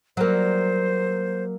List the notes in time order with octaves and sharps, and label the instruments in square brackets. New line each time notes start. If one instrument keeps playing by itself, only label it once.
[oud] F#3 G3 A#3 [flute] C5